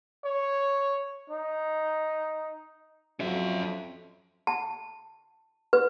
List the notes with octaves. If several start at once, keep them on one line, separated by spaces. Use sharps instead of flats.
C#5
D#4
F2 F3 F#3 C#4 E5
A5
B4